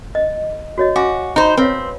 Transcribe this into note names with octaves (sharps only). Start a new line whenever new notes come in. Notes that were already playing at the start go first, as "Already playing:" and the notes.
D#5
F#4 C#5 D#5
F#4 F5 G#5 D6
D#4 C5 A#5 B5
C4 B4 C#5 F5